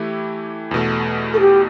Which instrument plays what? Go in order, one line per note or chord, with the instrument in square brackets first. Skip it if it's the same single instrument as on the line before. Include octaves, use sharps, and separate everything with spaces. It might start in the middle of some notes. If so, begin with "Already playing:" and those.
Already playing: [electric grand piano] E3 A3 E4 G4
E2 B2 A3
[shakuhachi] A4
G4